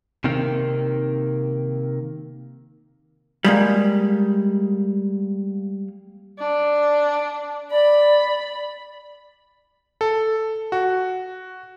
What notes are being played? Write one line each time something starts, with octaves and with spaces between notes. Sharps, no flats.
C3 D#3 A#3
G3 G#3 A#3
D4
D5 B5
A4
F#4